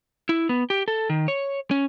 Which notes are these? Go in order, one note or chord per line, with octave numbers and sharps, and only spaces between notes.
E4
B3
G4
A4
D#3
C#5
C#4